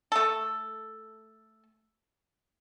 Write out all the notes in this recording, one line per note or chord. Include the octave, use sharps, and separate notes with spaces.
A3 A4